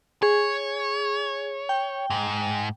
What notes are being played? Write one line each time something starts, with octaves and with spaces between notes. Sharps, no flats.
G#4 C#5
G5
G#2